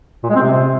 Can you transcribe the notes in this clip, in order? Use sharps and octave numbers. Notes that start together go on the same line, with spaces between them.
A#2
G#3
C4
C3